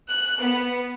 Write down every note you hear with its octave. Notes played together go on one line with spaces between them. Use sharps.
F#6
B3